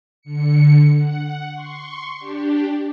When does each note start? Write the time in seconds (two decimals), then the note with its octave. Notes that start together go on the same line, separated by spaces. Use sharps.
0.22 D3 C#7
0.96 F#5
1.53 C6 C#6
2.19 D4 G4